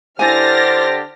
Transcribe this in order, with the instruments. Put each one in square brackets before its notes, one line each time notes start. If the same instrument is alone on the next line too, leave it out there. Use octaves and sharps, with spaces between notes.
[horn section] D3 G4 [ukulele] E4 G#5 [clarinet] C5 [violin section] F6 A6 A#6